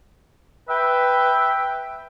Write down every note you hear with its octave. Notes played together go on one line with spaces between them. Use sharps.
B4 E5 G5